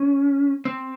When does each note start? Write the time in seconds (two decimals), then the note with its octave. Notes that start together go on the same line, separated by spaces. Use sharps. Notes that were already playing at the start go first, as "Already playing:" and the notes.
Already playing: C#4
0.65 C4